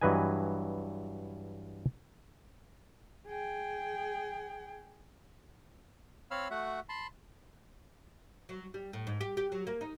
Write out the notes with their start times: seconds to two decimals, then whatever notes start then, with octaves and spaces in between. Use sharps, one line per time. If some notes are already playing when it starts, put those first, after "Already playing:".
0.02 G2 E3 F#3 B4 D#5 G#5
3.28 G#4 G5
6.31 C4 C#5 F5 B5 E6 F6
6.51 A3 F#4 E5 F#5
6.89 A5 B5 C6
8.49 F#3
8.74 G3
8.93 A2
9.07 G#2
9.21 G4
9.37 G4
9.52 F#3
9.67 A#3
9.81 D#4